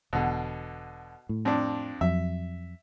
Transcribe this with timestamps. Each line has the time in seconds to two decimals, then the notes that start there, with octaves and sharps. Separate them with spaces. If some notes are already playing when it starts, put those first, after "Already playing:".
0.13 E1 B2 D3
1.29 A2
1.45 F2 D4
2.01 F2 F#3 E5